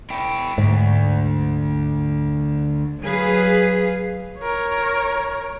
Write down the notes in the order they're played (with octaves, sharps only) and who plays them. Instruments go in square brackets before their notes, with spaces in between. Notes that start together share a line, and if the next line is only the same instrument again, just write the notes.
[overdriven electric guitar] E4 G5
[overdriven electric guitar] D2 [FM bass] G#2
[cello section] F#3 G#4 B4 F5
[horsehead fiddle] A#4 C#5